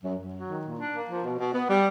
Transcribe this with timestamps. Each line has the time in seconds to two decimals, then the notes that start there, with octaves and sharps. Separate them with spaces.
0.03 F#2
0.18 F#2
0.33 F#3
0.48 D#3
0.64 A#2
0.78 D4
0.93 A#3
1.08 F3
1.24 B2
1.39 B2
1.54 B3
1.69 G3